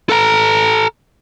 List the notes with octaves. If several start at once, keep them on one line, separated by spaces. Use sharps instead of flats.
A4 A#5